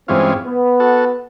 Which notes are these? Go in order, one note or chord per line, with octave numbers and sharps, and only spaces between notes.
G2 E3 G#3 C4 C#4 F4
B3
F#4 A4